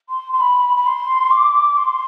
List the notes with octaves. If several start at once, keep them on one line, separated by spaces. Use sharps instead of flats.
C6
C6
B5
B5
C6
D6
C6